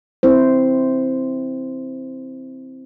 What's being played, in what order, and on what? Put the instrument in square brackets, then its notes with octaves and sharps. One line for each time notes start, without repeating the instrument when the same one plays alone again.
[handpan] C4 E4 C5